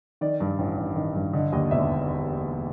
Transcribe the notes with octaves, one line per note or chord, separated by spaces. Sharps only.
D#3 D5
G2
A1
A1
D#3
G2
D3 D#5
D#2 D#5
E1 E5